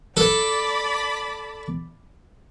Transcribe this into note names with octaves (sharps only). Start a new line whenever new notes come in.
A4 D5 A5 B5